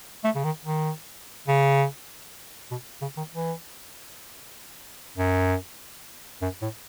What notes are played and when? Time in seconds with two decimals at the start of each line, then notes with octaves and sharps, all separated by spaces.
0.24 A3
0.35 C#3
0.44 D#3
0.65 D#3
1.47 C#3
2.71 B2
3.01 C#3
3.17 D#3
3.33 E3
5.18 F#2
6.42 F#2
6.62 A2